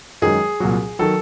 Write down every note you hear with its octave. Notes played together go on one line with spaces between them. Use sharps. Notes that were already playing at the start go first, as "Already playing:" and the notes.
F#2 D#3 G#3 G#4
C2 A#2 F#3
D#3 F#3 A4